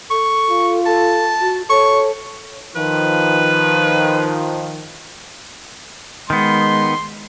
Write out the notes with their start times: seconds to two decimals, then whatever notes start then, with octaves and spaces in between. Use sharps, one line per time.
0.10 A4 C#6
0.50 F4
0.86 A4 A5
1.41 F#4
1.70 A4 C#5 C#6
2.76 D#3 F3 B4
6.30 D#3 G#3 B3 C6